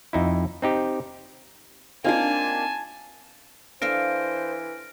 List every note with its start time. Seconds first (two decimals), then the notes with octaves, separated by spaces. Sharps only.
0.13 F2 D#4 E4
0.62 C4 D#4 G4
2.04 A#3 C4 D4 D#4 F4 G#5 A5
3.82 E3 D4 A4 C5 F5 F6 A#6 D7